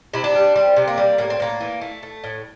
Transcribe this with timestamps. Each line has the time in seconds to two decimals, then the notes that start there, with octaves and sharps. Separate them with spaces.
0.13 C3 E4
0.24 D4
0.35 G3
0.56 G3 C4
0.76 C3
0.87 A#3
0.98 G3
1.18 A2 A#3
1.30 C4
1.40 A2 A#3
1.61 E3
1.81 A3
2.03 A3
2.24 A2